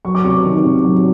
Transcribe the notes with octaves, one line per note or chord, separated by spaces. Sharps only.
F#3 C#6
D6
C3 C#6
D#3
C3
F#3